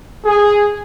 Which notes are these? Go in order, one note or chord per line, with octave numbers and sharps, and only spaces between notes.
G#4